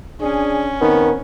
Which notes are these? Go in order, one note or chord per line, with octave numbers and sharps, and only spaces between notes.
C#4 D4 G#4
D#3 B3 C4